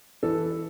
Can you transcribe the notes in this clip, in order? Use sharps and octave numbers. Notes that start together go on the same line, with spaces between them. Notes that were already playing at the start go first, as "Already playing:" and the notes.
E3 A4